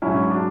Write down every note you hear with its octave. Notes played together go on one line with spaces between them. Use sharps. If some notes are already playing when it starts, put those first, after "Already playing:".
G#2 F#3 C#4 E4
D4 F#4